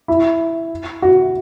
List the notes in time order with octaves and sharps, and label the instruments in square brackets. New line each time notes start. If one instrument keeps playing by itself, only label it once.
[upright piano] E4
F#4